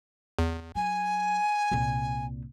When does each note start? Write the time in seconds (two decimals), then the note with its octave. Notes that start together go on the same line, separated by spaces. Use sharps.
0.39 E2
0.75 F#3 G#5
1.71 C2 A#2